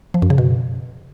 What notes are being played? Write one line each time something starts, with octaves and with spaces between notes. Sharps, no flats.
F3
F#2
C#3
B2